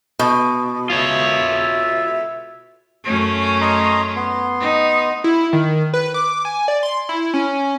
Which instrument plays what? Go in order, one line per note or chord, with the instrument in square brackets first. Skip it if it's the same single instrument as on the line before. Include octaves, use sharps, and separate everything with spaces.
[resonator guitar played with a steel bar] B2
[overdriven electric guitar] F4 C#5 [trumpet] E5
[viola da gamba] F#2 A3 C#4
[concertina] D#5 A#5 C6
B3 C6
[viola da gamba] D#4
[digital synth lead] E4
D#3
B4
D6
G#5
D5
C6
E4
C#4